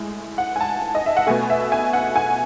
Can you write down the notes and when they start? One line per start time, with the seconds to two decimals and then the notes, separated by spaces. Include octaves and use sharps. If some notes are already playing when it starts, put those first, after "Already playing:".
Already playing: A2 G#3
0.38 F#5
0.56 G#5
0.61 A5
0.95 D#5
1.06 E5
1.17 F#5
1.27 B2 A3 G#5
1.50 E5
1.72 G#5
1.93 F#5
2.16 G#5